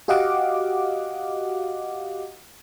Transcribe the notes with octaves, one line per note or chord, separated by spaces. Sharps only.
F#4 G4 D#5 F5 F#5 D6